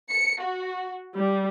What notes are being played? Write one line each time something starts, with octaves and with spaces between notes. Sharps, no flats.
C#7
F#4
G3